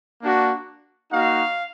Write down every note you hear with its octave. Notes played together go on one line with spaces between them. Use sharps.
A#3 D4 F#4
A#3 D#4 F#4 F5